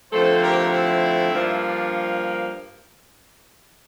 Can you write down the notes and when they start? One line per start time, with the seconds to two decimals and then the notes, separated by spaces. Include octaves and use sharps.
0.12 D3 F3 A3 C4 A4 C5
0.42 G4 A#4
0.73 E4
1.33 G2 F3 A#3 D4
1.62 D4